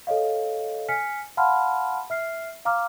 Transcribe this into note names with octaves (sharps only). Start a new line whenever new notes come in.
A4 C#5 D#5 F5
G#5 F6 B6 C#7
F5 F#5 A5 B5 C6 F6
E5 F6 C7
F5 A#5 D6 F6